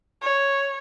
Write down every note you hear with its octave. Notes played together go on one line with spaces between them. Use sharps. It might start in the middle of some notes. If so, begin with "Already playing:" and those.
C#5